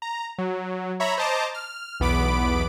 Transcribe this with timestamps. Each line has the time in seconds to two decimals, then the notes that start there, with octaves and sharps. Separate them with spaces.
0.02 A#5
0.38 F#3
1.00 C#5 E5 A#5 B5
1.18 C5 D#5 A5 A#5 D6
1.54 F6
2.00 B1 E2 B3 B5 D6 D7